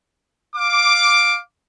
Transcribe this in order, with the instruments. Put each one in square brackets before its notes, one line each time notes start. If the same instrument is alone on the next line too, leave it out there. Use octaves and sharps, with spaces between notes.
[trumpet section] F5 D6